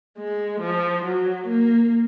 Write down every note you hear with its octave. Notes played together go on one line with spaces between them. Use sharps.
G#3
F3
F#3
A#3